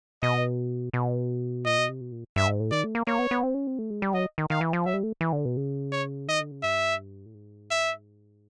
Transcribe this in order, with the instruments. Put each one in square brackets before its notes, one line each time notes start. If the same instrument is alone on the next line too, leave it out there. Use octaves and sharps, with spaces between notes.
[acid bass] B2 [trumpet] D#5
[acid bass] B2
[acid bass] A#2 [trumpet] D#5
[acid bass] B2
C3
B2
A#2
[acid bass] G2 [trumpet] E5
[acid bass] G#2
A2
[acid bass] D#3 [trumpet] D5
[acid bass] A3
A#3
[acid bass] A#3 [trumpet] C#5
[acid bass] B3
B3
C4
C#4
C4
A3
G#3
G3
[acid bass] F#3 [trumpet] D#5
[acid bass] D#3
[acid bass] D#3 [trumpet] F5
[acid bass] E3
F3
[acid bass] F#3 [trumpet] E5
[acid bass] G3
A3
E3
D3
B2
C#3
[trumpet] C#5
[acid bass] D#3 [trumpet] D#5
[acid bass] D3
C#3
[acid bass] G2 [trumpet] E5
[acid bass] A2
G#2
[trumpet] E5